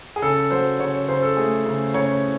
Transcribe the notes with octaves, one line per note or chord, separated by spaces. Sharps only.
G#4
C#3 A4
F#3 C5
C#3 C#5
C#5
C#3 C5
A4
A3 G#4
C#3
C#3 C#5